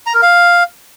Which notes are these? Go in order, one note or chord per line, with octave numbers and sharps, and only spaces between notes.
A#5
A#4
F5